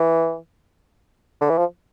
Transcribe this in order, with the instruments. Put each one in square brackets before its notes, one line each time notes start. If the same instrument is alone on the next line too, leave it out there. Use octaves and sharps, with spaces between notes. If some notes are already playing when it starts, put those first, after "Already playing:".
Already playing: [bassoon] E3
D3
E3
F3